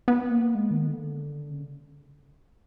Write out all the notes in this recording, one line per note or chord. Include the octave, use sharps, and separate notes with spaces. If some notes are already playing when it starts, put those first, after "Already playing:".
B3
A#3
G#3
D#3
D3
C#3